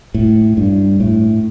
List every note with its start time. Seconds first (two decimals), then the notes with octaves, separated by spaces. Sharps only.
0.14 A2
0.57 G2
1.00 A2